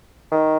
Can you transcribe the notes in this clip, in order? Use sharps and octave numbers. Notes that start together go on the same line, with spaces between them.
D#3